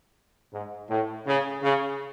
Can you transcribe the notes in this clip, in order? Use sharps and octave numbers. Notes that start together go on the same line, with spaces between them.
G#2
A2
C#3
C#3